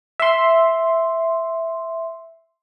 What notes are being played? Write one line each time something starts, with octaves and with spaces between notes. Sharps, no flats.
E5 C6